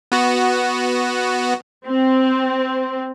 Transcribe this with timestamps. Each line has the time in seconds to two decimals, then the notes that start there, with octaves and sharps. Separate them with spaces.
0.12 B3 F#4
1.87 C4